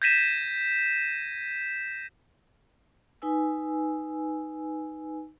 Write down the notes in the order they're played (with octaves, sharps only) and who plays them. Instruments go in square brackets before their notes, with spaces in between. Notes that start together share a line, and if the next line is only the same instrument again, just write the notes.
[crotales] G6 G#6 A#6 B6 D#7 E7
[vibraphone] D#4 B4 G#5 E6